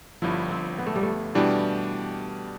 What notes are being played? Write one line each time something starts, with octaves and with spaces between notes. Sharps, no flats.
G1 G2 F3 E4
C4
B3
A3
G3
A3
B2 E3 G3 D4 G4